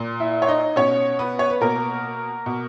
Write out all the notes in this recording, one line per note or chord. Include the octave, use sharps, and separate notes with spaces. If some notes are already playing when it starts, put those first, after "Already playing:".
Already playing: A#2
E4 E5
C#5
D#4 D#5
B2 C#4 C#5
B3 B4
C#5
B4
B2 A#3 A#4
B2